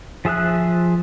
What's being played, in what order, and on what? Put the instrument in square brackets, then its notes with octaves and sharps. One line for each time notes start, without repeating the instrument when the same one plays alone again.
[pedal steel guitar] F3 G#4 E5 D#6 F#6